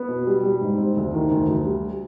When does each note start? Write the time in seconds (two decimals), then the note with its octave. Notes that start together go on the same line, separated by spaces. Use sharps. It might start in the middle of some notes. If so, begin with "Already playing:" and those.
Already playing: B3
0.09 B2
0.27 G3
0.43 G3
0.61 G#2
0.78 C4
0.97 D2
1.14 D#3
1.31 D2
1.48 D2
1.65 G3